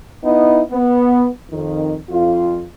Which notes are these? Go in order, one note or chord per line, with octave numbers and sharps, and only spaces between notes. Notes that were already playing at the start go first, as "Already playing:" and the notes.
B3 D#4 E4 D#5
B3
F2 D#3
F2 F4